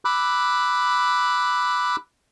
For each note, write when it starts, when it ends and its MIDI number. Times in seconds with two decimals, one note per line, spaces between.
0.05 1.96 83
0.05 1.96 86
0.05 1.96 88
0.05 1.96 90